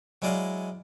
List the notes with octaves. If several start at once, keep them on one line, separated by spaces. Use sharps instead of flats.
F#3 G#3 E4 D5 D#5 F5